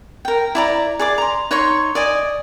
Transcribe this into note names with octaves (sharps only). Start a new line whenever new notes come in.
A#4 G5
E4 D5 A#5
G#4 D5 D6
A#5 C6
D#4 C#5 C6 C#6
D5 D#5 G#5